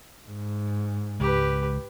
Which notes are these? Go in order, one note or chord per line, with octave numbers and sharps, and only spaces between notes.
G#2
C#2 G4 B4